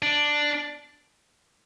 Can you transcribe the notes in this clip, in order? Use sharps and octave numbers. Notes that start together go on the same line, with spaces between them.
D4